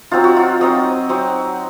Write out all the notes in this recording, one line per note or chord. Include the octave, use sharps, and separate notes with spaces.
F#3 C4 D#4 F4
F#4
F4
F#3 C4 D#4 D#5
F#3 C4 D#4